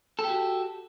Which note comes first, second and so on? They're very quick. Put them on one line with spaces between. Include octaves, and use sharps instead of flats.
A4 G4 F#4